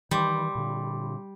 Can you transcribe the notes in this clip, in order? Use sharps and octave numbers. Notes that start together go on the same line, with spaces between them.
D#3 E3 G3 B5 C6 D6
A#2 D3